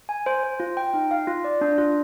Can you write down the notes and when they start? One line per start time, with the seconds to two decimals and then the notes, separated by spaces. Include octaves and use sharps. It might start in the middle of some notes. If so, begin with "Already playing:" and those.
0.09 G#5
0.26 C5
0.43 C5
0.60 F4
0.77 G5
0.94 D#4
1.11 F5
1.27 F4
1.44 D5
1.61 D4
1.78 F4